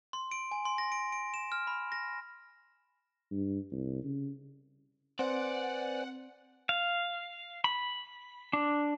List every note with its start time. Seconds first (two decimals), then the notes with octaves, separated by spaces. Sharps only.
0.13 C6
0.31 D7
0.51 G#5
0.65 C6
0.78 A#6
0.92 D7
1.12 D7
1.34 E7
1.52 F6
1.67 B5
1.92 A#6
3.31 G2
3.72 C2
4.04 C#3
5.19 C4 B4 C5 D5 F#5 G#5
6.69 F5
7.64 B5
8.53 D4